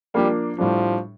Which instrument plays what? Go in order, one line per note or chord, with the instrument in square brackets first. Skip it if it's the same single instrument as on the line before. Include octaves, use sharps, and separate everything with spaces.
[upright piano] F3 A#3 D4 [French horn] G3
[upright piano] A2 G3 D4 [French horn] F3